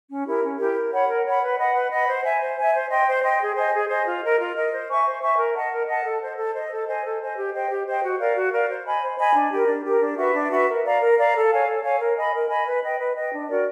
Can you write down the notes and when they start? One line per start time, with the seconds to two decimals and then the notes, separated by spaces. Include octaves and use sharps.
0.09 C#4
0.25 E4 G4 A#4
0.42 C#4
0.59 E4 G4 A#4
0.75 A#4
0.91 C#5 F#5 B5
1.08 A#4
1.25 C#5 F#5 B5
1.41 B4
1.58 D#5 F#5 B5
1.74 B4
1.91 D#5 F#5 B5
2.07 C5
2.24 E5 G#5
2.41 C5
2.57 E5 G#5
2.74 C5
2.89 D#5 G5 C6
3.06 C5
3.23 D#5 G5 C6
3.40 G#4
3.56 C5 D#5 G#5
3.73 G#4
3.89 C5 D#5 G#5
4.06 F4
4.22 A#4 D#5
4.39 F4
4.55 A#4 D#5
4.72 C5
4.88 E5 G#5 C#6
5.05 C5
5.21 E5 G#5 C#6
5.38 A#4
5.54 D#5 F#5 A5
5.71 A#4
5.87 D#5 F#5 A5
6.04 A4
6.21 C5 D#5
6.37 A4
6.54 C5 D#5
6.70 A4
6.87 C5 D#5 G#5
7.04 A4
7.20 C5 D#5 G#5
7.36 G4
7.53 C5 D#5 G5
7.69 G4
7.86 C5 D#5 G5
8.02 F#4
8.19 A#4 D5 F5
8.35 F#4
8.52 A#4 D5 F5
8.69 C5
8.85 D#5 G#5 B5
9.02 C5
9.18 D#5 G#5 B5
9.34 D4
9.51 G4 A#4
9.68 D4
9.84 G4 A#4
10.01 D4
10.18 F#4 B4 E5
10.34 D4
10.51 F#4 B4 E5
10.67 A#4
10.84 D5 F5 A#5
11.00 A#4
11.17 D5 F5 A#5
11.33 A4
11.50 C#5 F5 G#5
11.66 A4
11.82 C#5 F5 G#5
11.99 A#4
12.16 D#5 G#5 B5
12.32 A#4
12.49 D#5 G#5 B5
12.66 B4
12.82 D#5 G5
12.99 B4
13.15 D#5 G5
13.32 D4
13.48 F#4 A#4 D5